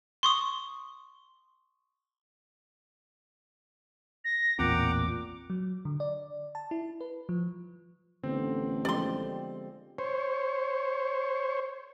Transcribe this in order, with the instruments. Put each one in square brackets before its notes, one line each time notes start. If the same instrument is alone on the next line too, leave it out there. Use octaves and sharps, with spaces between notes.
[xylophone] C6 C#6 D#6
[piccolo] A#6
[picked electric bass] A1 E2 C4 [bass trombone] A#2 [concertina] F#5 G5 A#5 [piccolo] D6
[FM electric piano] F#3
D3
D5
A5
E4
B4
F3
[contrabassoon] A1 [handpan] D3 B3 [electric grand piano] C4
[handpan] F3 G#3 G4 [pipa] D5 C6
[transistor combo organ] C5 C#5